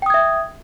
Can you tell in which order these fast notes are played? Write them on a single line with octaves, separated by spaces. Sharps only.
G5 D#6 G#6 E5